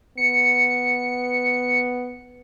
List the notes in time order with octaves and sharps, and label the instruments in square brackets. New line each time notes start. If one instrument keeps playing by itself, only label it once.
[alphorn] B3 [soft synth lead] C#7